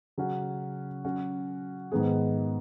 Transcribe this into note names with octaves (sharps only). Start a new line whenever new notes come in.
C#3 F#3 C#4 F#4
F#3 C#4 F#4
G#2 D#3 B3 G#4